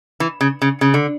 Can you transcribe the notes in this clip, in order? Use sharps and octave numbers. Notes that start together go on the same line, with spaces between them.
E3
C#3
C#3
C#3
D3